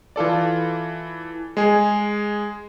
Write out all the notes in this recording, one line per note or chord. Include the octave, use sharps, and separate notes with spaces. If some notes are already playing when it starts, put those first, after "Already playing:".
E3 F4 A4 D5
G#3 G#4